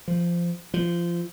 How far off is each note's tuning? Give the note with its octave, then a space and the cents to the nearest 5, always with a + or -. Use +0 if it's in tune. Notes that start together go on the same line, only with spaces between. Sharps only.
F3 -15
F3 -20